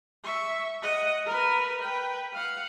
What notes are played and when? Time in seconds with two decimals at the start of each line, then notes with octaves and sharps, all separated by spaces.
0.23 E5 C#6
0.82 D#5 F#5
1.26 A#4 B4
1.82 B4 G5
2.33 F5 F#5